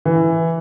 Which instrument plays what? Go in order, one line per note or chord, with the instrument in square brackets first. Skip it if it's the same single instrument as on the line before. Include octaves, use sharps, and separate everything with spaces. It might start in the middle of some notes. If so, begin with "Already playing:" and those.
[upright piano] E3